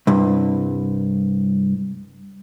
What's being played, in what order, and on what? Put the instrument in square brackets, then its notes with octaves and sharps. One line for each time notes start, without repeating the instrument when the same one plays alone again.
[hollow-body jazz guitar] C2 G2